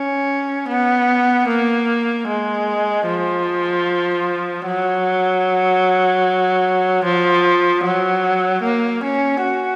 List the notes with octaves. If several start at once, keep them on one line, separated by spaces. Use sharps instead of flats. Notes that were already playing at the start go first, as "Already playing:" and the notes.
Already playing: C#4
B3
A#3
G#3
F3
F#3
F3
F#3
A#3
C#4
F#4